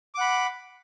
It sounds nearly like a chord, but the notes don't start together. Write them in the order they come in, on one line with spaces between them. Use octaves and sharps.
D6 F#5 B5